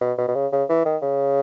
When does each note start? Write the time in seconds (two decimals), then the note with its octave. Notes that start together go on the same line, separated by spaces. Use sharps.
0.01 B2
0.18 B2
0.28 B2
0.35 C#3
0.52 C#3
0.69 E3
0.85 D#3
1.02 C#3